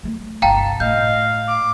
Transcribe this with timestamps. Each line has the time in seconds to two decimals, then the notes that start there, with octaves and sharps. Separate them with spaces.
0.03 F#3 A3
0.42 G1 C2 F5 G5 A5 A#5
0.80 A2 D#5 F5 G6
1.47 D6